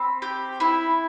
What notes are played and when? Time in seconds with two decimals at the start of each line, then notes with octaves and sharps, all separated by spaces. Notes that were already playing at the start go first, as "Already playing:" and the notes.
Already playing: C4 B5
0.22 G4
0.60 E4